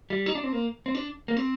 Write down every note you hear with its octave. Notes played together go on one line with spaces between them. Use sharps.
G3
D#4
D4
C4
A#3
C4
D4
A#3
C4